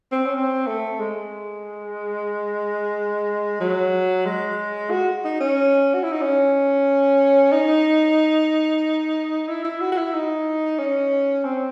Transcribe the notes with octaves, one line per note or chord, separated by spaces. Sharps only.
C4
C#4
C4
A3
G#3
F#3
G#3
F#4
D#4
C#4
F#4
E4
D#4
C#4
D#4
E4
E4
F#4
F#4
E4
D#4
C#4
C4